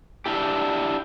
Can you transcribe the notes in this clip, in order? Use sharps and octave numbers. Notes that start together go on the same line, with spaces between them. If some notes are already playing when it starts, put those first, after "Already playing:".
D4 E4 G4